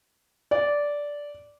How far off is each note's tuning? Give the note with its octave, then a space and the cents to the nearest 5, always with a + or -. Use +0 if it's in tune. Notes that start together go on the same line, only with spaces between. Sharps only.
D5 -10